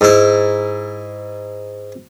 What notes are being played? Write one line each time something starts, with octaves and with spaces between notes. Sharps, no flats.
G#2 E4